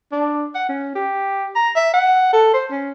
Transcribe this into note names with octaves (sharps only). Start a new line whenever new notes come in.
D4
F#5
C#4
G4
A#5
E5
F#5
A4
C5
C#4